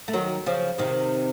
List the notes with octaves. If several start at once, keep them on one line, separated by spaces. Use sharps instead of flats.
A3
D#3 F#3
C#3 F3
C3 D#3